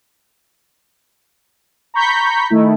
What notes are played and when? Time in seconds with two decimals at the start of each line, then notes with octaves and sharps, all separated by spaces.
1.94 A#5 B5 C#6 G6 B6
2.50 D#3 A3 E4